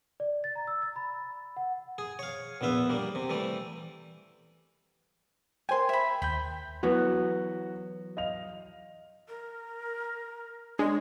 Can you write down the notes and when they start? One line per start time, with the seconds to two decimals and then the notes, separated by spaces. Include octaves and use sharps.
0.20 D5
0.44 A6
0.56 A#5
0.67 E6
0.82 A6
0.96 B5
1.57 F#5
1.98 G#4
2.19 C#5 F5
2.61 A#1 E2 B3 E5 F5
2.89 G3 A#3
3.15 C3
3.30 E3 G3 A3
5.69 A#4 C5 G5 G#5 C6
5.89 E5 B5
6.22 D#2 G5 B5 G6
6.83 E3 F#3 B3 F#4
8.17 D#5 F5 F7
9.29 A#4
10.79 G#3 D4 C#5